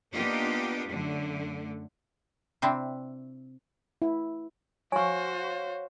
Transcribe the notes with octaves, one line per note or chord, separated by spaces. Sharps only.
A#3 B3 D4 D#4 F4 G4
F#2 D3 A3
C3 C4 D4 E4
E4
F#4 C5 C#5 F5 G#5 C#6